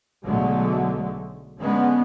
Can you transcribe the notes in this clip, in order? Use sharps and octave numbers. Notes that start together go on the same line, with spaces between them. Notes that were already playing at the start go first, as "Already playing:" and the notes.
B1 D3 F#3 G#3 A3
D3 G#3 B3 C#4